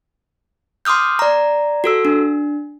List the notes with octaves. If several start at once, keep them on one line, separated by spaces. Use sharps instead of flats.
C6 D6 D#6 F6 G6
D5 A#5
F#4 A4 E6
D4